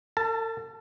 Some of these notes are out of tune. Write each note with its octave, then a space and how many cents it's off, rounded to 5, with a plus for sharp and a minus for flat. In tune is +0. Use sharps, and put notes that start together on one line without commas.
A4 +45 A5 +0